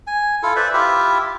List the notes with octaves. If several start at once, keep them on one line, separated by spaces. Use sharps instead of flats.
G#5
E4 F4 A4
B4 C5 D5 E5
E4 F4 G4 E5